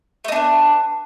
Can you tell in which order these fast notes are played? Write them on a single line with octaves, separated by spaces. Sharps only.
A3 D#4 D4 B3